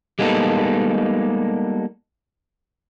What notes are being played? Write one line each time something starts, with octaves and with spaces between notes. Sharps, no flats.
G3 G#3 A#3 B3 D#4 A4